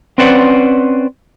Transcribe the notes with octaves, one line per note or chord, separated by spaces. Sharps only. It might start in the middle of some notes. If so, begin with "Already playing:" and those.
C4 C#4 B4 C5 D5 F#5